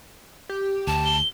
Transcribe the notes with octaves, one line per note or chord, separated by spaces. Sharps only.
G4
D2 A5
G7